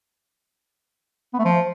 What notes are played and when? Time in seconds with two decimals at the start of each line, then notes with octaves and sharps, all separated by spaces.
1.34 B3
1.39 A3
1.45 F3